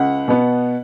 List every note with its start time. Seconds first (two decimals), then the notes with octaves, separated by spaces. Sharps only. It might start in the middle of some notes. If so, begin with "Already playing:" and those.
Already playing: C#2 F#5
0.28 B2 B3